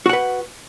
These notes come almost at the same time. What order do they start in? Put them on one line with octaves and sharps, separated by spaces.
F#4 F#5 B4